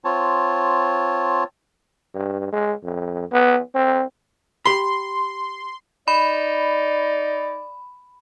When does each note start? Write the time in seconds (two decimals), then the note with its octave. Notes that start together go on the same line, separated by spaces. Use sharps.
0.05 C4 F4 C#5 A5
2.14 G2
2.52 G#3
2.83 F2
3.32 B3
3.75 C4
4.65 G4 B5 C6
6.08 D#4 D5 B5